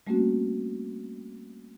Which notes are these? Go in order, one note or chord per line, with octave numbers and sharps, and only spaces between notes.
G3 A3 A#3 C4 C#4 F#4